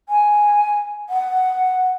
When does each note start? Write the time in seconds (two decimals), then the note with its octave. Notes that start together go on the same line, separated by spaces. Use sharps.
0.09 G#5
1.09 F#5